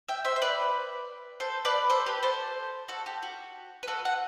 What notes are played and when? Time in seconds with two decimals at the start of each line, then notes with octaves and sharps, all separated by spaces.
0.08 E5 G5
0.25 C5 E5
0.36 C5
0.42 B4 D5
1.40 A4 C5
1.65 B4 D5
1.90 A4 C5
2.06 G4 B4
2.23 A4 C5
2.88 F#4 A4
3.06 G4
3.23 F#4
3.83 B4
3.87 F#4 A4
4.05 F#5